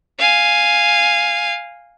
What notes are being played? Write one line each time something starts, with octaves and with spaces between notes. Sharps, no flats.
F5 G#5